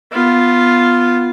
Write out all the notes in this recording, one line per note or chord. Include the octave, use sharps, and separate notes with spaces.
B3 F4